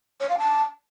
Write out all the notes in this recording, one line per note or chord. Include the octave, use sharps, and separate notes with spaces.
C#5
F5
A5